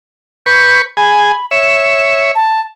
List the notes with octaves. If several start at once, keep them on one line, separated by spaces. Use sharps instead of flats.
B4 C#6 G6
G#4 G#5 B5
C#5 E5 E7
A5